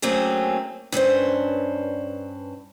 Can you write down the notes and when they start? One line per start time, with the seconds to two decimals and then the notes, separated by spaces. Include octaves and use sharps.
0.02 F#3 A3 A#3 C4 C#4 G#4
0.92 G2 C#4 B4 C5